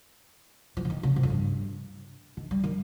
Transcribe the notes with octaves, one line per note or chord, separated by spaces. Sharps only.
F3
C#3
D#3
C#3
C3
F2
G2
D#3
G3
D#3